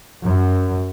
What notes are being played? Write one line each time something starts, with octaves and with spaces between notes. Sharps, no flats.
F#2